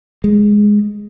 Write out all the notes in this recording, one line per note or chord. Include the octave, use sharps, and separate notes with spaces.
G#3